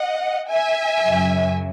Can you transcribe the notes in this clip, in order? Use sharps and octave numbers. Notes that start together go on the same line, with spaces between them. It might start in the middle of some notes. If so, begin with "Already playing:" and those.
Already playing: D#5 F#5
E5 G#5
F#2 C#3 F#3